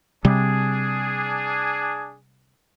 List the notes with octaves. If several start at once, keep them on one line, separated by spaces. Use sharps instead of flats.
C3 G3 D4 G#4